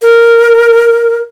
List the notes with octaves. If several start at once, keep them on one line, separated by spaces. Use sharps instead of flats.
A#4